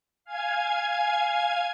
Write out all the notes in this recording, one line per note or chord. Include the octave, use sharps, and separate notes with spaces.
F5 G#5 G#6